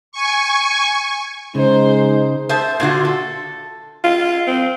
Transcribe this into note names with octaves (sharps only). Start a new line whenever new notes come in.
G#5 C#6
C#3 G#3 D#4 C5
C5 E5 A5
A#2 D3 F4 F#4
A4
F4
C4